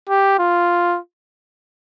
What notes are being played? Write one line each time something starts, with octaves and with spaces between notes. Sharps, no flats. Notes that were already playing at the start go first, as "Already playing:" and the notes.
G4
F4